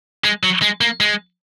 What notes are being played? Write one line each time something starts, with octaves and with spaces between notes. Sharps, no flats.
G#3
F#3
G#3
A#3
G#3